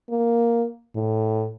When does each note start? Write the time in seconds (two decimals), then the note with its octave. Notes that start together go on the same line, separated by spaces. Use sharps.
0.10 A#3
0.95 A2